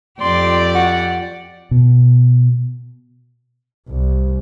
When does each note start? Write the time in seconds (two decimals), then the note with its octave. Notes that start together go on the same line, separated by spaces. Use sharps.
0.21 F2 G4 D5 C6
0.75 F#5
1.71 B2
3.88 C2